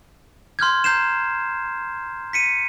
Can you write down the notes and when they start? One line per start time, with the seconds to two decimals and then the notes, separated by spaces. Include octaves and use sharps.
0.59 C6 F6 G6 G#6
0.84 A#5 G6 C7 E7
2.33 B6 C#7 D#7